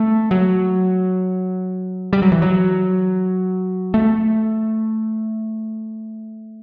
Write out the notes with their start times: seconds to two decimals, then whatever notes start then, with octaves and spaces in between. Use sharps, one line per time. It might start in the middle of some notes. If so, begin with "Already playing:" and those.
Already playing: A3
0.31 F#3
2.13 G3
2.22 F#3
2.32 E3
2.42 F#3
3.94 A3